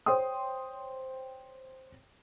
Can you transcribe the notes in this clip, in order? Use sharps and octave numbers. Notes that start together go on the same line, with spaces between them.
C5 C#5 G5 C6 D#6